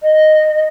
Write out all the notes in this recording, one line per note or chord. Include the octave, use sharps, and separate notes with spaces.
D#5